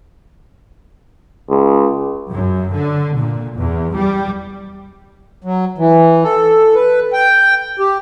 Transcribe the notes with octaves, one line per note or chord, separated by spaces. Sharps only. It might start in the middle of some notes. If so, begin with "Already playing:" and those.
C#2
F#2
D3
A#2
E2
G3
F#3
E3
A4
B4
G5
G4